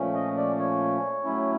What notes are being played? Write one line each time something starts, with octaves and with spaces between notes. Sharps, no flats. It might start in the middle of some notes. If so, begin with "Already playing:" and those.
Already playing: A#2 F3 A3 C#4
D#5
D5
C#5
A2 F#3 A3 C#4 E4